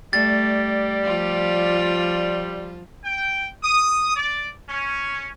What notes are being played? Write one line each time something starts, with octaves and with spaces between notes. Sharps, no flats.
G3 A3 D5 A6
F3 F4
G5
D#6
D5
C#4